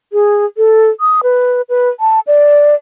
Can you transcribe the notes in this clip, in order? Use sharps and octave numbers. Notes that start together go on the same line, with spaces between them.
G#4
A4
D#6
B4
B4
A5
D5